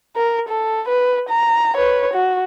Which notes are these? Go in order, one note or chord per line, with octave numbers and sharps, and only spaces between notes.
A#4
A4
B4
A#5
B4 C#5
F#4